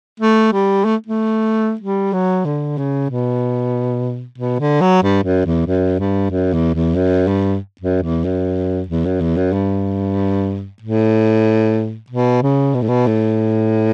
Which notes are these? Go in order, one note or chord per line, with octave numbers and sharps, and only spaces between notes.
A3
G3
A3
A3
G3
F#3
D3
C#3
B2
B2
D3
F#3
G2
F#2
E2
F#2
G2
F#2
E2
E2
F#2
G2
F#2
E2
F#2
E2
F#2
E2
F#2
G2
A2
B2
C#3
B2
A2
B2
A2